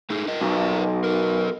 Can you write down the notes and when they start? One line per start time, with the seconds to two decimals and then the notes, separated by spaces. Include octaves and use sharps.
0.10 A3 D#4 G#4
0.28 F4 A#4 D#5
0.41 B1
1.04 F#3 A#4